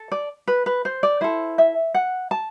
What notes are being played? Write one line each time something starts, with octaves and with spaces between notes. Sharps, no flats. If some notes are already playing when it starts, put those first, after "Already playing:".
Already playing: A4
D5
B4
B4
C5
D5
E4 A4 C5
E5
F#5
A5